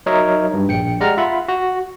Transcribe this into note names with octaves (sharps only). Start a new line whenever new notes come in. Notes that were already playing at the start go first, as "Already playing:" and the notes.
F#3 D#4 A#4 C#5 D#5 E5
G2
A#1 G5 C#7
G#3 G4 D5 F#5 A#5 F6
F4 E5 F#5 B5
F#4